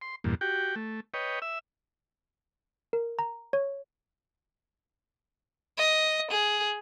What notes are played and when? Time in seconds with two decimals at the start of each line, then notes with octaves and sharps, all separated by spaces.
0.01 C6
0.24 E2 G2 A#2
0.41 F#4 G4 G5
0.76 A3
1.14 B4 C#5 D#5 G5
1.42 E5 E6
2.93 A#4
3.19 A#5
3.53 C#5
5.78 D#5
6.31 G#4